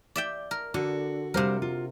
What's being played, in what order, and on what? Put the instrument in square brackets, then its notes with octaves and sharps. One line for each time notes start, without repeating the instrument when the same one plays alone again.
[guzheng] D5 E5 G5
A#4
[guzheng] D3 [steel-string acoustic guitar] F#4 [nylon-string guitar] A4
[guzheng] C3 A#4 [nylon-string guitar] G3 C5 F5
[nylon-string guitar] F4